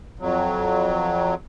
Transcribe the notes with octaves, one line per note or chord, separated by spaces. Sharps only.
F2 F#3